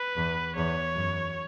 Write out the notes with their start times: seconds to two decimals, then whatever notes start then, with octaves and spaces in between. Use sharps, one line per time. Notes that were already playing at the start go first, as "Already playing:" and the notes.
Already playing: B4
0.16 E2
0.56 E2 C#5
0.95 F#2